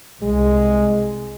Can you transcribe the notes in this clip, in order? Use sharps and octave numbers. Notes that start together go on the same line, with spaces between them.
C2 G#3